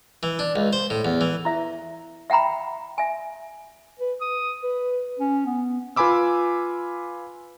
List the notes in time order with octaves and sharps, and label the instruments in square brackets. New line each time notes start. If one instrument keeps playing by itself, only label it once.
[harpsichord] E3
D4
C#2
C5
A2
E2
E3
[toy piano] E4 E5
E5 F#5 G5 A#5 B5
E5 G#5
[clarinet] B4
D#6
B4
C#4
B3
[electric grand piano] F4 B4 G#5 B5 D6 E6